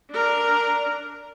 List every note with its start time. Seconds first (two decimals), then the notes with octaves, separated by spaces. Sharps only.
0.11 D4 A#4